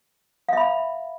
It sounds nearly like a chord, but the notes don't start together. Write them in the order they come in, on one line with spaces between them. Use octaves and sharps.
F5 E5 B5